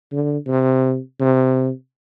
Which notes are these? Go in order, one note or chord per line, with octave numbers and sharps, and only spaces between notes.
D3
C3
C3